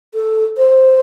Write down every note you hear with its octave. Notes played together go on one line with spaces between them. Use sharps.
A4
C5